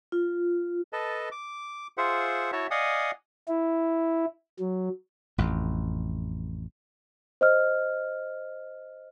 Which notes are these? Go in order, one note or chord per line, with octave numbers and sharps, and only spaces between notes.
F4
A4 B4 D#5 A5
D6
F4 G#4 C5 E5 F#5
E4 F#4 C#5 E5 A5
D5 D#5 F5 F#5 G#5 D#6
E4
F#3
A1 F2
C5 D#5 F6